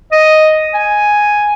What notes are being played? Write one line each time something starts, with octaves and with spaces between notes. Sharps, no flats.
D#5
G#5